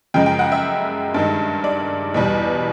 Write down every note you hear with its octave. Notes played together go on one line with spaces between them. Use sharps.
F#2 C#3 F3 G#3 G5
G5
F#5
E5
G2 D#3 G#3
D5
E2 B2 G3